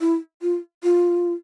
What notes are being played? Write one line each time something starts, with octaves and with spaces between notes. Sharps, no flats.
E4
F4
F4